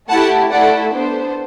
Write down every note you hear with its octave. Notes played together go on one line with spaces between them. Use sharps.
A3 E4 G4 F#5 A5
A3 E4 A4 D5 F#5
B3 D4 A4 C5